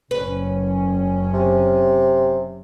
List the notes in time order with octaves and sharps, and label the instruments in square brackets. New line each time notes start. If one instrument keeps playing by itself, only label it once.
[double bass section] F#1 C#4 [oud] B4
[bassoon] C3